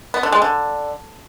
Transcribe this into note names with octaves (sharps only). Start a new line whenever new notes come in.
B3
D3
G#3
D3